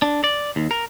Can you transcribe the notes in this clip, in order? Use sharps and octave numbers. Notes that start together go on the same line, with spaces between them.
D4
D5
D#2
A#4